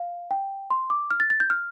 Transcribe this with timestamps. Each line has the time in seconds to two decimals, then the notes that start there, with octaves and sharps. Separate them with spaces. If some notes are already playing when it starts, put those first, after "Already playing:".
Already playing: F5
0.31 G5
0.70 C6
0.90 D6
1.11 F6
1.20 A6
1.30 A6
1.40 G6
1.50 F6